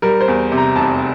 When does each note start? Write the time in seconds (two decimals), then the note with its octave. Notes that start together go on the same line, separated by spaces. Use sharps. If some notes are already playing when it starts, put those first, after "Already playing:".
0.02 G3 A#4
0.21 C5
0.28 E2
0.52 C3
0.58 A#5
0.76 F1 A5